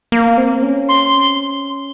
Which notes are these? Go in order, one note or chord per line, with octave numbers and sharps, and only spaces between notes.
A#3
C4
C#4
C6